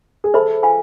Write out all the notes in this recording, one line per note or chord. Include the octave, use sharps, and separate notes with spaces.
G#4
A4 C5 E5 B5
F4 B4 F5 G#5 B5